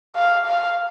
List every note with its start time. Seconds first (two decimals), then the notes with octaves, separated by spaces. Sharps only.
0.16 F5
0.46 F5